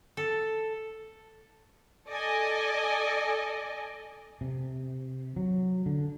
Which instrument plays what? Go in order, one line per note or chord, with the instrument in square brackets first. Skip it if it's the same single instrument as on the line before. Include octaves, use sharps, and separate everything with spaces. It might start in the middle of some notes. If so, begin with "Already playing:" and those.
[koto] A4
[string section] A4 D5 D#5 G#5
[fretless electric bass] C3
F#3
D3